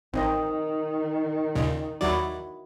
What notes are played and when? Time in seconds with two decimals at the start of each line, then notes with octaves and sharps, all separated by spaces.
0.14 A1 D#3 C4 D#4 D#5
1.55 D#2 A#2 C#3
2.01 D#2 F#3 E4 F#4 D5